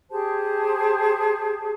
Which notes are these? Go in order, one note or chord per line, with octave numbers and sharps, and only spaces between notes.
G4 G#4 C5 A5